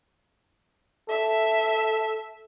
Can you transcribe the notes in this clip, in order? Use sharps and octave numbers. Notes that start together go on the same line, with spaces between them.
A4 E5